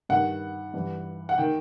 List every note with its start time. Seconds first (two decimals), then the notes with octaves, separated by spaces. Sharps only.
0.09 G2 D#3 F#5
0.74 G2 E3
1.29 F#5
1.38 D#3 G5